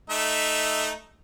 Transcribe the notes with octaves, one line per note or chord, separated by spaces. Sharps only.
A3 D#4 E5